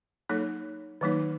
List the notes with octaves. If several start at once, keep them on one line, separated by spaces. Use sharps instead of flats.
F#3 A#3 D#4 A4 C#5
D#3 F#3 A#3 D#4